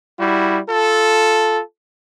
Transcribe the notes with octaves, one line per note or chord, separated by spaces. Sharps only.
G3 E4 F#4
F4 A4